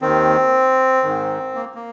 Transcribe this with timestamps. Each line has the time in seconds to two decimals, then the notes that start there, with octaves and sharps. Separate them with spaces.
0.02 D#2 D#3 C4
1.03 G#2 D#3
1.55 A#3
1.75 A#3